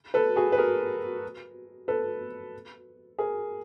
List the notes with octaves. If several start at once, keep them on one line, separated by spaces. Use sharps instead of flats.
A4 B4
F#4 G#4
B4
G#4 A#4
A4 B4
G#4 A#4